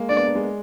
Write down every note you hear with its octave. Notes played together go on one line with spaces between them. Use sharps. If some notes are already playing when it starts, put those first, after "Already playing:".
Already playing: G#3 A#3
D4 D5
B3
A#3
G#3